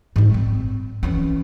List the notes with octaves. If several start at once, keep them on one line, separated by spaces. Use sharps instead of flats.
G#2 G3
C4
E3 C#4